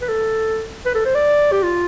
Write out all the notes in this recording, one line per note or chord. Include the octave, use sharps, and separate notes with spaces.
B4
A4
B4
A4
C5
D5
G4
F4